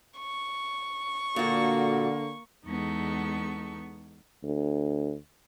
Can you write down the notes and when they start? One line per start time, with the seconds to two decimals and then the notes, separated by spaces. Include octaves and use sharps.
0.19 C#6
1.36 A#2 D3 A#3 F#4
2.64 E2 G#3 B3 D#4 A4 C#6
4.44 D2